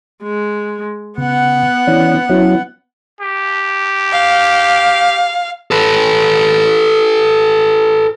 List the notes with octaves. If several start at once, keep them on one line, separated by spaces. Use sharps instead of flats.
G#3
C#3 B3 F#5
E3 C#4 D4
F#3 C#4 E4
G4
F5
A4 B4